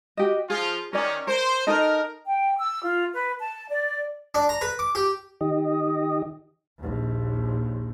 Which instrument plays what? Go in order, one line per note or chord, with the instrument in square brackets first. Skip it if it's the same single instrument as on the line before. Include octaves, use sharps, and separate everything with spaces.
[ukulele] F#4 G4 D#5
[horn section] F3 F4 [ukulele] G#4
[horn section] D#3 C#4 [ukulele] A#4 D5
[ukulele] A#4 [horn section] C5
[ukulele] D#4 A4 D#5 [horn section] A#4
[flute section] G5
E6
F4
B4
A5
D5
[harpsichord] D4
A#5
B4
D6
G4
[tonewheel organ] D#3 G4 D#5
[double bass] A#1 D#2